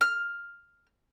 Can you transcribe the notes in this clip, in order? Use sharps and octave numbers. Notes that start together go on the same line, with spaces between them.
F6